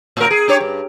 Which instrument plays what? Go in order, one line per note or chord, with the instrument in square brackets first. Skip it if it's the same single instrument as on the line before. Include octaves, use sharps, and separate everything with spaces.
[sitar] A2 A#4
G#4
D4 G4 C#5
G2